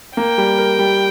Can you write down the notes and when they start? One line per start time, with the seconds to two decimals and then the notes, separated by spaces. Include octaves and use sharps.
0.17 A#3 G5
0.38 G3
0.58 A#4
0.79 G3